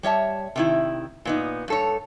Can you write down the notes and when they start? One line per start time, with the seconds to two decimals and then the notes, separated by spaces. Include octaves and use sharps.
0.03 G3 C#5 E5 A5
0.56 C3 D#3 E4
1.25 A#2 B3 D#4
1.68 G2 A4 C#5